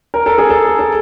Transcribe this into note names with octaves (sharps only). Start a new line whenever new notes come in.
A#4
A4
G#4
A4
A4